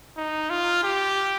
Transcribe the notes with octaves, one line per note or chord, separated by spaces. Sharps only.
D#4
F4
G4